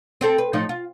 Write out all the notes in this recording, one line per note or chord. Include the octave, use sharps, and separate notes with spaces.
C4 G4 A4
B4
A2 F3 D#4
F4